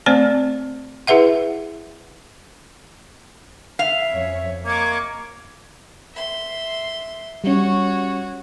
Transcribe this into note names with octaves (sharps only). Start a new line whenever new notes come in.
A3 C4 C5 D5 G#5
E4 G#4 B4 E5 F#5
E5 F5
F2 C#4 C#5
A#3 D#5 C#6 D6 G#6
E5 C6
G3 C#4 F#4 C#5